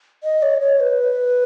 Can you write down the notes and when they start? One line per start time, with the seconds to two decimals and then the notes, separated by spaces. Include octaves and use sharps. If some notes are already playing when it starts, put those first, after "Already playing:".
0.24 D#5
0.42 C#5
0.61 C#5
0.80 B4